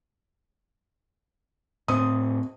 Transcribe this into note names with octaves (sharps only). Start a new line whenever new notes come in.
A2 C4 D#6